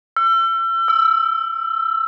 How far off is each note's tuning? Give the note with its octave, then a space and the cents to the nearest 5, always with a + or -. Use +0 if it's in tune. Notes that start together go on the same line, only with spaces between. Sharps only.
E6 +35
E6 -5